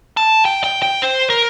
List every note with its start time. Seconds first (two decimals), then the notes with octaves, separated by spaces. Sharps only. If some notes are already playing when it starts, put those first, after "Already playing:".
0.17 A5
0.45 G5
0.64 G5
0.82 G5
1.02 C5
1.30 A#4